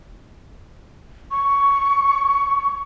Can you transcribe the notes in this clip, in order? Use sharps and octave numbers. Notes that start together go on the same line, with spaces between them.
C#6